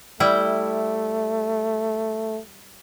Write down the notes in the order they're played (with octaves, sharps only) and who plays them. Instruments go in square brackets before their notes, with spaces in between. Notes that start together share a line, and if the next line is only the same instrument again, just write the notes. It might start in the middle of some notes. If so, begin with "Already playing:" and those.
[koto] G3 E4 G5 [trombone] A3